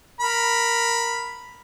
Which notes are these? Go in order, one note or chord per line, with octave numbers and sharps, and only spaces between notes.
A#4 B5